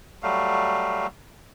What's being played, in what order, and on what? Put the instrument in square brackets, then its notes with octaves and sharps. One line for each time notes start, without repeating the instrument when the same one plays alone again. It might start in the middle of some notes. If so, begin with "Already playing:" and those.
[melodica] F#3 G3 A3 F5